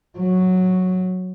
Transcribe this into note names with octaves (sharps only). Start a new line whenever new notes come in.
F#3